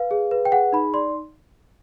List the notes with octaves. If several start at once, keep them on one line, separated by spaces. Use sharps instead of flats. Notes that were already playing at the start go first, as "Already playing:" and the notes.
Already playing: B4 F5
G#4
B4
G5
G#4 F#5
D#4 B5
D5 C6